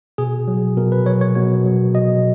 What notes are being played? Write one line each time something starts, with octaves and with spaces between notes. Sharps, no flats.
B2 G#4
F#3
B2 A#4
B4
F#3 C#5
C#5
B2 C#5
F#3
B2 D#5